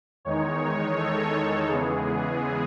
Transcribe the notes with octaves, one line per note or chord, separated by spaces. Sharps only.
E2 D#3 G#3 D#4 C#5
A4
E2 C#3 E3 G#3 B3 G#4